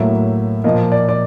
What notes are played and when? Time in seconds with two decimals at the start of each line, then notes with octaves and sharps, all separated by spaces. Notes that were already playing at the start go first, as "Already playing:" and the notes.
Already playing: A2 F#3 A#3 E5
0.64 A#2 F3 A#3 D#5
0.92 D5
1.09 D5